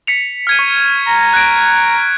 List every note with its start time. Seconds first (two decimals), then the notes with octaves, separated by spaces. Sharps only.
0.07 B6 C#7 F7
0.47 F6 G#6 D#7
0.59 C#6
1.06 A#5
1.33 F#6 G#6 D7